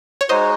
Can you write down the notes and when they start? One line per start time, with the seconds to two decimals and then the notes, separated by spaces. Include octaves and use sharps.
0.21 C#5
0.29 G#3 D#4 F#4 C5 D#5